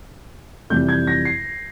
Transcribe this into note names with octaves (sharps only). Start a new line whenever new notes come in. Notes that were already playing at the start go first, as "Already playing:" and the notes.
F2 C3 E3 G3 G6
G#6
A#6
C7